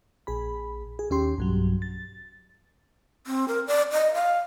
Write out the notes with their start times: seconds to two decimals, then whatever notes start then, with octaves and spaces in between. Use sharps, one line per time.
0.27 A#1 G#4 B5
0.99 G#4
1.10 D#2 C#4 G4 C6
1.38 B1 G2 F#3
1.82 A6
3.27 C4
3.48 A#4
3.67 D5
3.92 D#5
4.14 F5